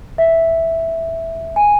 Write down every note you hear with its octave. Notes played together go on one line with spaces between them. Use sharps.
E5
G#5